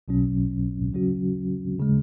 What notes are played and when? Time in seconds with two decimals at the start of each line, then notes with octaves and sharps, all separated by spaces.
0.08 B1 B2 F#3 C#4
0.93 C#3 F#3 C#4 F#4
1.79 C#3 G#3